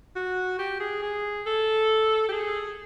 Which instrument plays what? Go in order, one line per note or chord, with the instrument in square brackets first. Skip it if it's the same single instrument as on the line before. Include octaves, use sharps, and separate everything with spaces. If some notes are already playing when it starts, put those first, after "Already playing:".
[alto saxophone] F#4
G4
G#4
G#4
A4
G4
G#4